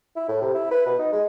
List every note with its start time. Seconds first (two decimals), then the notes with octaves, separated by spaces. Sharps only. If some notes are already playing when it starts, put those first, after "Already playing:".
0.16 E4
0.28 A2
0.41 C3
0.54 E4
0.71 B4
0.86 B2
0.99 D#4
1.13 G#3